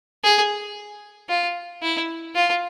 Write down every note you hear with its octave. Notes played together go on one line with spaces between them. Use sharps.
G#4
F4
E4
F4